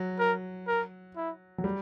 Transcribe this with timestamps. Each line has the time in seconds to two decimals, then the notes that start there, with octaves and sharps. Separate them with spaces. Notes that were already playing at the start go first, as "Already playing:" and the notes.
Already playing: F#3
0.19 A#4
0.67 A#4
1.16 E4
1.58 F#3
1.64 G3